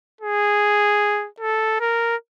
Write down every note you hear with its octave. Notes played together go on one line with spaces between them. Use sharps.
G#4
A4
A#4